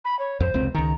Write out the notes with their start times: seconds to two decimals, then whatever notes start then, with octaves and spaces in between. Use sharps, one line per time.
0.05 B5
0.19 C#5
0.40 F2 C5
0.54 F1 C#2 C4
0.74 C#2 D#3 A#5